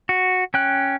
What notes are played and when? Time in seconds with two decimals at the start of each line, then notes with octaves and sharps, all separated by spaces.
0.09 F#4
0.54 C#4 G5 F#6